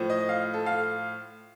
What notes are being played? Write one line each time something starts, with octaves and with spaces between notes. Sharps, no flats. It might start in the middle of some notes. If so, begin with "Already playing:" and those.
Already playing: A2 F3
D#5
F5
A4
F5